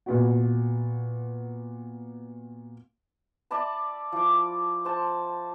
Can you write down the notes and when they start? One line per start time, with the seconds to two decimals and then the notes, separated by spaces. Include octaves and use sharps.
0.06 A#2 B3 F#4
3.51 D5 E5 A5 B5
4.12 F3 D6
4.85 C5 A5